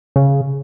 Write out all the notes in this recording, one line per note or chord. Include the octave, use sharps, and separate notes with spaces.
C#3